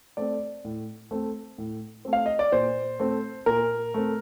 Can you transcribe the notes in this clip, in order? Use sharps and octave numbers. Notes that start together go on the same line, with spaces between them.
A3 C4 D5
A2
A3 C4
A2
A3 C4
F5
D#5
D5
A#2 C5
A3 C4
A#2 A#4
A3 C4